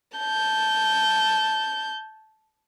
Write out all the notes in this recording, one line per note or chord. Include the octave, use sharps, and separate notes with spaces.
A5 G6